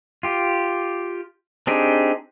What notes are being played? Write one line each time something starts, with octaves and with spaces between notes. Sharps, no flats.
F4 G4
C4 D4 D#4 G4 G#4